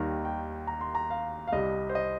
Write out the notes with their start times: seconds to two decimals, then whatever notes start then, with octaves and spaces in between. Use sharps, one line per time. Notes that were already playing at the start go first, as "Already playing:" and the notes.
Already playing: D#2 D#3 G3 A#5
0.25 G5
0.67 A#5
0.81 C6
0.95 A#5
1.10 F5
1.47 F5
1.52 C2 C3 G3 D#5
1.89 C5
1.95 D#5